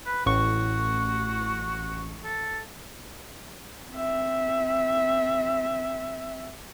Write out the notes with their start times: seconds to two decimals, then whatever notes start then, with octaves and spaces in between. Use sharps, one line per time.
0.06 B4
0.26 A1 F#4 C#6
2.25 A4
3.91 C4 E5